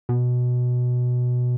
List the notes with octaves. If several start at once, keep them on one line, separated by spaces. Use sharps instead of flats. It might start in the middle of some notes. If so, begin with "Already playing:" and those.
B2